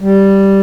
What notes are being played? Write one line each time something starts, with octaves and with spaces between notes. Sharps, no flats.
G3